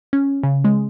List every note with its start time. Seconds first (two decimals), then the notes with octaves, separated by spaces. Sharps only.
0.13 C#4
0.43 C#3
0.65 G#3